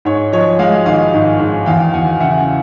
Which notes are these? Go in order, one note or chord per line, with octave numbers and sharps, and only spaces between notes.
G#2 C#5
F3 C#5 D#5
G#3 D#5 F5
G#1 D#5 F5
G#2
G#2
E2 F5 G5
E2 F#5 G#5
C#3 E5 F#5